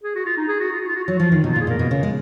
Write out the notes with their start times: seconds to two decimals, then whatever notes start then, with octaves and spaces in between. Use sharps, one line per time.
0.04 G#4
0.15 F#4
0.26 F4
0.37 D#4
0.48 G#4
0.60 F#4
0.72 F4
0.81 F#4
0.88 F4
0.95 F#4
1.04 F4
1.08 F#3 F#4
1.19 F3 F4
1.32 D#3
1.44 B2 D#4
1.53 A#2 F4
1.61 G#4
1.67 A#2 A#4
1.79 B2
1.91 C#3
2.03 G#3